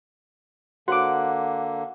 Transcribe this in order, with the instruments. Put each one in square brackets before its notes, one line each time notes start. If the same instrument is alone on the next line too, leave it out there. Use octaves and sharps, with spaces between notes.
[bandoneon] D3 A#3 [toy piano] F#4 C5 C#5 [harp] F#5 D6